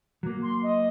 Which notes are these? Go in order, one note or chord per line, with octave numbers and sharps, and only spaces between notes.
F#3 A#3
C6
D#5